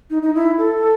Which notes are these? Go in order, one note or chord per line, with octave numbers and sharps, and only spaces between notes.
D#4
D#4
E4
A4